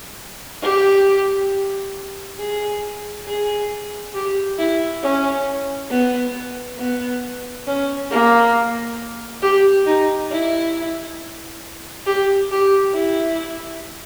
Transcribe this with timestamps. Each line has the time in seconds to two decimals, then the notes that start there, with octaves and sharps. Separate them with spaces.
0.62 G4
2.39 G#4
3.27 G#4
4.14 G4
4.59 E4
5.03 C#4
5.91 B3
6.79 B3
7.67 C#4
8.11 A#3
9.43 G4
9.87 D#4
10.31 E4
12.07 G4
12.51 G4
12.95 E4